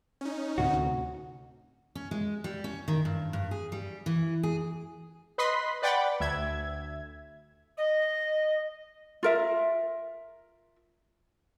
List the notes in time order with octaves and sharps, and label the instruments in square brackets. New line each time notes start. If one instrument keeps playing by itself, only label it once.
[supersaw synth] C#4 D#4
[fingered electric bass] D2 A2 C3 [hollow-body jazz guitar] F#4
[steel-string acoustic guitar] C#4
G#3
G3
C#4
D#3
G2
G2
G#4
G3
E3
G#4
[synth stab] B4 D#5 B5 C6 B6
B4 D5 F#5 G5 B5 A6
D2 E5 G#6
[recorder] D#5
[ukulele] F4 A#4 E5